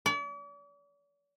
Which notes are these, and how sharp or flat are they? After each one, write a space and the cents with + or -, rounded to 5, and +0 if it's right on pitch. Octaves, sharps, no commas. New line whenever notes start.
D5 -45